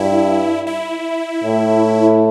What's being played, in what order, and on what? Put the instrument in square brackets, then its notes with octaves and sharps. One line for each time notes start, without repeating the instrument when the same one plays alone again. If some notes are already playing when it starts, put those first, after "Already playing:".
Already playing: [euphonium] G2 [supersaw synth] E4
[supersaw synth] E4
[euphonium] A2